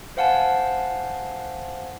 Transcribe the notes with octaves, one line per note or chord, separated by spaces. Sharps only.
C5 F5 F#5 G#5 A5